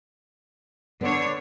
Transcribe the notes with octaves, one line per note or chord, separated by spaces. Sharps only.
D3 B3 D4 C#5